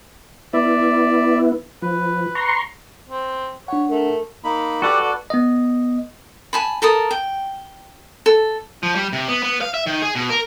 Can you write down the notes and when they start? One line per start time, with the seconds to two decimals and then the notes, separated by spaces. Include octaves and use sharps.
0.53 B3 E4 D5 E5
1.82 F3 B4
2.35 A#5 C6 C#6
3.07 C4
3.68 D4 C#5 F#5
3.89 A3 A#4
4.44 A#3 D#4 B5
4.82 F#4 G4 A4 B4 D5 F#5
5.02 D5
5.30 B3 D#5
6.53 G#5 A5 B5
6.82 A4 A#4 A5 D#6
7.11 G5
8.26 A4
8.83 F3
8.95 G3
9.13 C3
9.28 B3
9.43 B3
9.61 F5
9.74 E5
9.86 D#3
10.02 G#4
10.15 B2
10.30 A#4